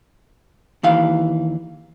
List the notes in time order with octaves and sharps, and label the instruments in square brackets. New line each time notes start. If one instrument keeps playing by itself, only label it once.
[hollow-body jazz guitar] D#2 E3 F5